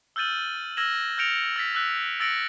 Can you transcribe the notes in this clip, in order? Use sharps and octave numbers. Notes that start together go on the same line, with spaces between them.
E6 F6 G6 A6 D#7 F#7
E6 F6 G#6 A#6 E7 F#7
F6 G6 A#6 C#7 D7 F7
E6 A6 B6
E6 F#6 B6
E6 A6 A#6 C#7 D7 F#7